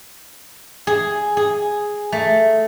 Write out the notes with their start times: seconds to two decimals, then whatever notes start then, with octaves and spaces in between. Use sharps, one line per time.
0.87 G#4
1.37 G#4
2.12 A3